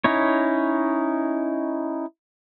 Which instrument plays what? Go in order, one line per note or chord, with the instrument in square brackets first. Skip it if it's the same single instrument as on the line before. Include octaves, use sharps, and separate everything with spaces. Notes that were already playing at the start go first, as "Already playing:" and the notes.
[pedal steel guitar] C#4 D#4 E4 C#5